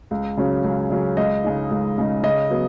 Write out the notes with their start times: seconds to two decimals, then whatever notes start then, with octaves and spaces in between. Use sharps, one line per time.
0.11 C#2
0.37 C#3 F#3 C#4
0.64 C#2
0.90 C#3 F#3 C#4
1.17 C#2 D#5
1.44 C#3 G#3 D#4
1.71 C#2
1.98 C#3 G#3 D#4
2.23 C#3 D#5
2.50 F#3 B3